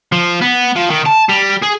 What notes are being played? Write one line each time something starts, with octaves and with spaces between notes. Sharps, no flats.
F3
B3
F3
D#3
A5
G3
G#4